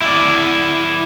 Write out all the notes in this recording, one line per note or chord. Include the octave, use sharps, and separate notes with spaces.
E4 D5